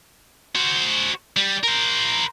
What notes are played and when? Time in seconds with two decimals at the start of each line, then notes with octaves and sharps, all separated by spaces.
0.55 F#4 C5
1.37 G3
1.64 A#4 C5